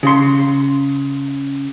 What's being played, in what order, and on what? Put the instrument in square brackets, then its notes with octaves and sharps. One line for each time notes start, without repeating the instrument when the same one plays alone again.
[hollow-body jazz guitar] C#3 C6